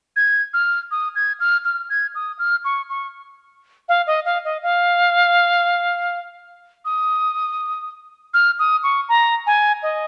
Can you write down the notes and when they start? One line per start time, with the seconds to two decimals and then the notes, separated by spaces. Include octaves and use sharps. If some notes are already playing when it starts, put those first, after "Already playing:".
0.16 G#6
0.54 F6
0.91 D#6
1.15 G#6
1.40 F6
1.64 F6
1.90 G#6
2.15 D#6
2.39 F6
2.65 C#6
2.89 C#6
3.89 F5
4.07 D#5
4.25 F5
4.45 D#5
4.63 F5
6.85 D#6
8.34 F6
8.59 D#6
8.83 C#6
9.09 A#5
9.46 G#5
9.83 D#5